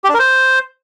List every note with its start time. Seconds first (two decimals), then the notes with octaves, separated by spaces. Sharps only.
0.04 G4
0.09 D4
0.14 A#4
0.19 C5